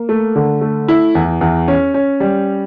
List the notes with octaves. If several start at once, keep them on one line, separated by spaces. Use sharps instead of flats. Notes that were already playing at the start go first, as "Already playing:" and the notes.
Already playing: A#3
A3
D3
A3
E4
E2
E2
C#4
C#4
G3